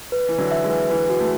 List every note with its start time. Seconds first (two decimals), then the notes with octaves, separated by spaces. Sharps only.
0.12 B4
0.28 E3 B4
0.38 D3 F#3
0.51 E5
0.64 E3 G#3
0.70 B4
0.90 E3 G#3 B4
1.10 F#4
1.20 A3